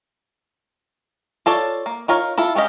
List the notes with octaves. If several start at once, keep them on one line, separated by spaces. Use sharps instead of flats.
F4 A4 C#5 D5
A#3
D#4 F4 A#4 C#5
E4 F4 A4
G#3 C#4 G4 D#5 F5